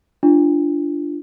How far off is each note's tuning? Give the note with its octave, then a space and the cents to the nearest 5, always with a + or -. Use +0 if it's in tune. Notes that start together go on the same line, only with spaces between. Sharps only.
D4 +0 F4 -25